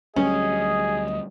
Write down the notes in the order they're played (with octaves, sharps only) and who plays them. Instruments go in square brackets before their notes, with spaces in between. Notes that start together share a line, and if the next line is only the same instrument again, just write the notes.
[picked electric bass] D2 F#3 G3 [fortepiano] C#4 [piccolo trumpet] G#4 [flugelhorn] D#5